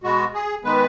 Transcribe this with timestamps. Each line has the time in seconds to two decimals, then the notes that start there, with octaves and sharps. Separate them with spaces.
0.03 B2 G#3 B3 F#4
0.34 G#4
0.64 D#3 G#3 B3 B4